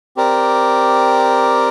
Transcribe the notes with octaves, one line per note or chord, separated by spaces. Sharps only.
C4 G4 A#4 D5